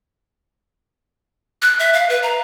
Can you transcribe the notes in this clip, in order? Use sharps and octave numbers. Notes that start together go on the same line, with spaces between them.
F#6
E5
F5
B4
A#5